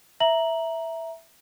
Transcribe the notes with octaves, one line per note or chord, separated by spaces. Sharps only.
E5 A#5 F#7